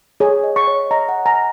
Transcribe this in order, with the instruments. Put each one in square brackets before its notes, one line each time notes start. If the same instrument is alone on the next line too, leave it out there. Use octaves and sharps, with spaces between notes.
[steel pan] G#4 [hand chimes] C#5
[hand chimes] D#5
[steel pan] C#6
[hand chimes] C#5
[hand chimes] D#5 [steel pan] A#5
[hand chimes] F#5
[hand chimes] G#5 [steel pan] A#5